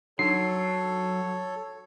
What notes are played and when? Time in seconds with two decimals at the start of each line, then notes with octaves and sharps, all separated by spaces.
0.19 F#3 D4 D#4 A4 C#5 C7